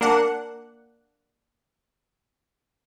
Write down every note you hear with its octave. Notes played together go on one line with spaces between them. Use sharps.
A#3 D4 F#5